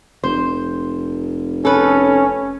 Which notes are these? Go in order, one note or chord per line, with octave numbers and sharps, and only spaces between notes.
F1 C5
C#4 A4 B4